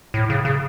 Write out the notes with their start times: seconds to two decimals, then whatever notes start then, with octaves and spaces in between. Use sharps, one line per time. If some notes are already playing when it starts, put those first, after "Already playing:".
0.14 A2
0.30 C#3
0.45 C#3